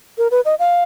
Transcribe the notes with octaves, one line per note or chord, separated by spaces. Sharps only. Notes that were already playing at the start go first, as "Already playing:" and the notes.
A#4
B4
D#5
F5